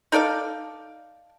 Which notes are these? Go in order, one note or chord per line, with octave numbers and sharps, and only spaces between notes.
D#4 A4 D5 F5